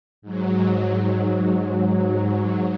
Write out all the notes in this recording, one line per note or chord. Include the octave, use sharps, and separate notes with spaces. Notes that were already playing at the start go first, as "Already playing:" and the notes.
G#2 F#3